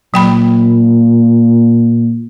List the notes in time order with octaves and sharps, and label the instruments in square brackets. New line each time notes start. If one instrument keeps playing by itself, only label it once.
[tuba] A#2 [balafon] F#3 G5 B5